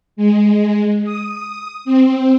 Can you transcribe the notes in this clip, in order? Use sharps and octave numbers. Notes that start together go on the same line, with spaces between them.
G#3
D#6
C4